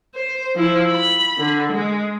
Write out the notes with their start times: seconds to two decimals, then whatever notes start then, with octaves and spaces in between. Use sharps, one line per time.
0.15 C5
0.55 F3 E4
0.90 B5
1.38 D3
1.73 G#3